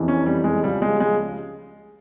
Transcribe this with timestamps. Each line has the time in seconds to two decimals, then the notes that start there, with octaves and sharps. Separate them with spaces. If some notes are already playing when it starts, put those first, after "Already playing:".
Already playing: F1 E2 C3 E3
0.08 C#4
0.26 G3
0.44 G#3
0.63 C#2 C#3 F3 G3
0.82 G#3
1.00 G#3